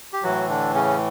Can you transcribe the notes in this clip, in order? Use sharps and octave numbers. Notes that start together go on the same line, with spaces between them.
G4
A2 E3 F#3 F#4
D3 D4
C#3 C#4